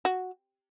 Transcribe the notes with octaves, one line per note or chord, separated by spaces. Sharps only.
F#4